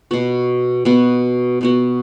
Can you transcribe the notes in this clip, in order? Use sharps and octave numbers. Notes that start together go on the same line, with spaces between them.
B2 B3 F#4
B2 B3 F#4
B2 B3 F#4